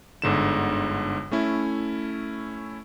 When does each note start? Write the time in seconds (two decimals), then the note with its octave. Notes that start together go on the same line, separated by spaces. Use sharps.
0.22 G1 G#2 D3 E7
1.32 A3 C#4 E4